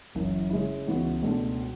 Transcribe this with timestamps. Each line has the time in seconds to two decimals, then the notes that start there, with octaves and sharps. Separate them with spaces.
0.15 F#1 F#2 E3
0.50 C#3 G#3 C#4 E4
0.87 C#2 C#3 E3 B3 F#4
1.23 C#2 B2 A3 D4
1.60 F#4